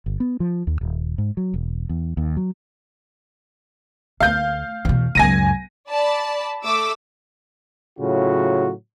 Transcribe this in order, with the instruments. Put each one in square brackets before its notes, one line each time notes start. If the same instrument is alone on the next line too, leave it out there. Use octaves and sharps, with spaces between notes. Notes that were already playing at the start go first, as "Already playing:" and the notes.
[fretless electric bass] G1
B3
F3
D#2
D#1
G#2
F#3
E1
E2
D#2
F#3
[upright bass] D2 [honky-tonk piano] F5 G6
[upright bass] E2 B2
[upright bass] C#2 F#2 [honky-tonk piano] G#5 A#6 D#7
[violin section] D5 A5 B5
A3 D6 E6
[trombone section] A2 C#3 F#3 F4 F#4